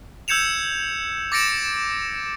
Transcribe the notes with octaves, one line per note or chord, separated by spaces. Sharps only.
E6 G6 G#6 C#7 E7 F7
D6 A6 A#6 C#7 D7 E7